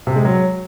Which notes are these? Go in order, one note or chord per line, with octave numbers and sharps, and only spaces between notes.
C3
G#3
F#3